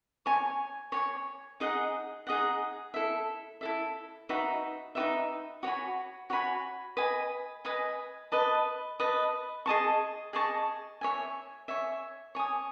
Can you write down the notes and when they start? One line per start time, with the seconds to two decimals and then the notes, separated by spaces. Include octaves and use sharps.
0.26 C#5 G#5 C#6
0.92 C#5 G#5 C#6
1.60 D#4 G#4 D#5 F#5
2.27 D#4 G#4 D#5 F#5
2.94 E4 A4 E5
3.61 E4 A4 E5
4.29 D#4 F#4 B4 E5
4.95 D#4 F#4 B4 E5
5.63 F#4 C#5 G#5 B5
6.30 F#4 C#5 G#5 B5
6.97 B4 D#5 G#5 B5
7.65 B4 D#5 G#5 B5
8.32 B4 D#5 A5
9.00 B4 D#5 A5
9.66 G#4 D#5 A5 C#6
10.33 G#4 D#5 A5 C#6
11.01 C#5 E5 G#5
11.68 C#5 E5 G#5
12.35 C#5 G#5 D#6